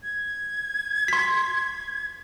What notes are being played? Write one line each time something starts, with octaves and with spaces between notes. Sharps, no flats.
G#6
C6 B6